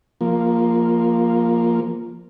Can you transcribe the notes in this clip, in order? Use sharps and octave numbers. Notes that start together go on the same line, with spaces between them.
F3 A#3